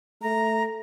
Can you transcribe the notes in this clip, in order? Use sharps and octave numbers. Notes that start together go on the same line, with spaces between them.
A3 A#5